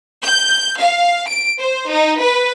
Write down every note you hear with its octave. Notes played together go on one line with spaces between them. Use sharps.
G6
F5
D7
C5
D#4
B4